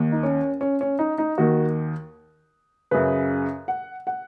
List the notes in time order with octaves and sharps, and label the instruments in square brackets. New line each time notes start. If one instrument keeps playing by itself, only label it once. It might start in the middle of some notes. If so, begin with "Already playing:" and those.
Already playing: [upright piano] D#2 D#3
D#4
C#4
C#4
C#4
D#4
D#4
D#2 D#3 F#4
F#2 C#3 B4
F#5
F#5